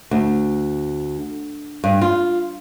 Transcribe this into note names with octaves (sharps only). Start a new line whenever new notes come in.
D2
G2
F4